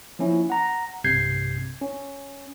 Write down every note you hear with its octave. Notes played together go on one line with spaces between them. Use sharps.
F3 A#3 C#4 E4
F#5 A#5
B1 G2 C3 G6 G#6 C7
C#4